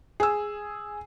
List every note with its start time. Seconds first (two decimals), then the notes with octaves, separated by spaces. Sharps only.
0.20 G#4 E6